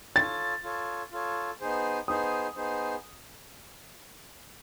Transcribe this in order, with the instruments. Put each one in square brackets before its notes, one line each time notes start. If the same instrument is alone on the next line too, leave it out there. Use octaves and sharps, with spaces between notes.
[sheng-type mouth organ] F4 A4 C#5 [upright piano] A6
[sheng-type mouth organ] F4 A4 C#5
F4 A4 C#5
B3 D#4 G#4 C5
[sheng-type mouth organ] B3 D#4 G#4 C5 [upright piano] D#6
[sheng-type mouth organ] B3 D#4 G#4 C5